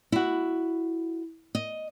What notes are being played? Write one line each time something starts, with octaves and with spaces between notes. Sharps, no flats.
E4 F#4
D#5